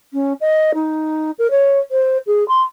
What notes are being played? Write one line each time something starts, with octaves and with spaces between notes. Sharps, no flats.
C#4
D#5
D#4
A#4
C#5
C5
G#4
C6